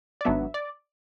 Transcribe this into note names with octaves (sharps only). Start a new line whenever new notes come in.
D5
G#1 G#2 F#3 B3 D4 E5
D5